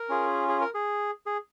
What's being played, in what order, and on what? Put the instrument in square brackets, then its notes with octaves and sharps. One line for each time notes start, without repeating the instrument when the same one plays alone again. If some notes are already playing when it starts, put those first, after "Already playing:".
Already playing: [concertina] A#4
C#4 F4 G#4
G#4
A#4
G#4
G#4